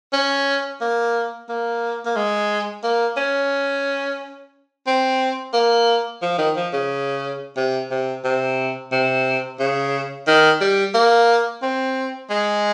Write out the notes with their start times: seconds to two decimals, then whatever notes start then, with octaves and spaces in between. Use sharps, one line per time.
0.13 C#4
0.81 A#3
1.49 A#3
2.06 A#3
2.16 G#3
2.84 A#3
3.17 C#4
4.87 C4
5.54 A#3
6.22 F3
6.38 D#3
6.56 F3
6.73 C#3
7.57 C3
7.91 C3
8.24 C3
8.92 C3
9.60 C#3
10.27 D#3
10.61 G3
10.94 A#3
11.62 C4
12.30 G#3